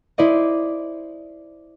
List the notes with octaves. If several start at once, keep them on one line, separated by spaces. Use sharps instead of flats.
E4 C5 D5 D#5